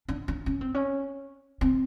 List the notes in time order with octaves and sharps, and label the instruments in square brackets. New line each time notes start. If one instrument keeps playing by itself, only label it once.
[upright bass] D4
D4
C#4
C4
C#4
C4